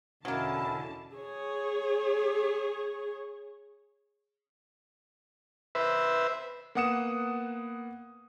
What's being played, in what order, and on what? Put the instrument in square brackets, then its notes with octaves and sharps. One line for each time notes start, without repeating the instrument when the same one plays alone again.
[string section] E2 D3 A5 [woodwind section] B2 C#4 [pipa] F#3 A#3 [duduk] E4
[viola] G#4 C#5
[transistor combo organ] B4 C5 E5
[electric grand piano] A#3 B3 F#5 D#6 C#7 E7